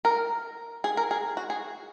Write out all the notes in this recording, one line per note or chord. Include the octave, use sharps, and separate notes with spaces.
A#4
G#4
A#4
G#4
F#4
G#4